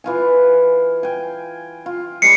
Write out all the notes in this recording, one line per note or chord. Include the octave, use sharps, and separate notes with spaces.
E3 F4 G#5
G5 G#5
F4
G#3 D5 B5 C7 C#7